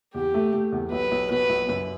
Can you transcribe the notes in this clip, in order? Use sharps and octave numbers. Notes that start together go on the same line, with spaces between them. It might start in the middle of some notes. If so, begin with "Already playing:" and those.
E2 G4
A3
A3
E2
B1 B4
B1
B2 B4
B1
F#2